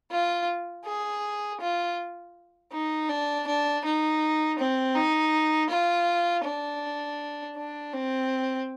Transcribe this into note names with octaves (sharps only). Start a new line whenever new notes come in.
F4
G#4
F4
D#4
D4
D4
D#4
C4
D#4
F4
D4
D4
C4